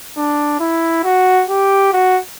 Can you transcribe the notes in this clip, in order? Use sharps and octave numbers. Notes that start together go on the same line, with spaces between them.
D4
E4
F#4
G4
F#4